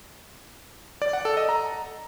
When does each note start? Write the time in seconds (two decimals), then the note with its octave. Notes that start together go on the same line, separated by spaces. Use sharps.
1.02 D5
1.13 F#5
1.25 A4
1.37 D#5
1.49 A#5